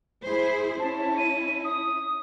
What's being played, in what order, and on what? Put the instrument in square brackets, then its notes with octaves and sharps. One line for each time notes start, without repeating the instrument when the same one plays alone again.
[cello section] E4 G#4 C5
[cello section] C#4 E4 [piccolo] A5
[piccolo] D#7
D#6